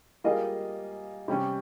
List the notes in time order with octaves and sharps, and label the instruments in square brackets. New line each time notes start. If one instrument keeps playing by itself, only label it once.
[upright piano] G3 A#3 F4 G#4 D#5
C3 G3 C#4